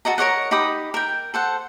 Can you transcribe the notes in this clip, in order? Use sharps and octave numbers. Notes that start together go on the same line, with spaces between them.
F#4 A4 D#5 A#5
A#4 C#5 D#5 F#5
D#4 G4 B5 D#6
A#4 G5
A4 C5 F#5